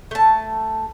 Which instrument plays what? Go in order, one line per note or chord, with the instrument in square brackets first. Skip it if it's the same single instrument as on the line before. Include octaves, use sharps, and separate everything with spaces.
[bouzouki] A3 A5